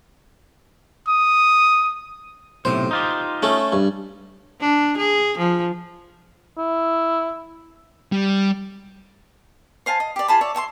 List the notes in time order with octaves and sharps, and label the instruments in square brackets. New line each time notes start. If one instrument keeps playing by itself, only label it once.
[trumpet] D#6
[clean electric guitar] B1 A2 C3 [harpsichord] C5
[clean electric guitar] D#4 F4 G4
[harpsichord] A3 C#4 A4
G2
[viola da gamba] D4
G#4
F3
[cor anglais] E4
[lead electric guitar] G3
[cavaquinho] C5 F5 G#5 A5
D#5
G4 D5
F4 G#4 A5 B5
C#5 D5 E5
C#5 E5 A5 C6